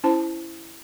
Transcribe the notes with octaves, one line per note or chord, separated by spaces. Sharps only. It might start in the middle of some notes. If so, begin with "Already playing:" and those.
C#4 E4 C5 A5